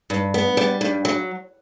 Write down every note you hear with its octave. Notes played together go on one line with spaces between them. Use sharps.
G2
B3
G3
G2
F#3